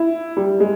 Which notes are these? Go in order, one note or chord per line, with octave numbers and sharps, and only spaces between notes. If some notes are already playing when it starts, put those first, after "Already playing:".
Already playing: E4
G3
G#3